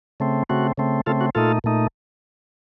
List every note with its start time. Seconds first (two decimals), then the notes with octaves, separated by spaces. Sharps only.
0.20 C#3 A3 C4
0.49 C#3 A3 C4 F#4
0.78 C#3 A3 C4
1.06 C#3 A3 C4 F4 A4
1.21 F#4
1.35 A#2 A3 D#4 F4 A4
1.64 A#2 A3 D#4